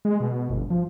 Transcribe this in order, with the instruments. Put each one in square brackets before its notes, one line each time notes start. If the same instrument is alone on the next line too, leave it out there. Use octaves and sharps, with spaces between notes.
[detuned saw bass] G#3
B2
G1
F3